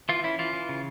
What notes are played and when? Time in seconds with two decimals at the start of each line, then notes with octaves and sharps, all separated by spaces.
0.09 E3 F4
0.24 C#4 E4
0.39 E3 F4
0.53 E3
0.69 C#3